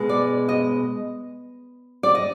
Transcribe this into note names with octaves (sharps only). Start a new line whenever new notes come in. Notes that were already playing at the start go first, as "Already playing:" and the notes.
Already playing: B2 G#3
D5
D#5
D5
D#5